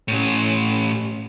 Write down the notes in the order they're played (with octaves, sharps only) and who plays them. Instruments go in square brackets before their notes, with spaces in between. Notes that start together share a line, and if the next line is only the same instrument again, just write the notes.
[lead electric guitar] A2 C#4